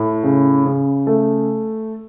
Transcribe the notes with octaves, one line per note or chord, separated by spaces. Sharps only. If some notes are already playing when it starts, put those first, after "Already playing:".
Already playing: A2
C#3
C#3
A3